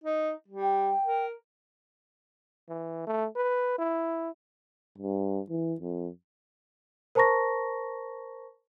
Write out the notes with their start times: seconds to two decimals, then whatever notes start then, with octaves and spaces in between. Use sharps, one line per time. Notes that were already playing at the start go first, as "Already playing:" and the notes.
0.04 D#4
0.48 G3
0.62 G5
1.04 A#4
2.69 E3
3.07 A3
3.36 B4
3.79 E4
4.98 G2
5.49 E3
5.80 F2
7.15 A#4 C5 A5 A#5 C#6 A#6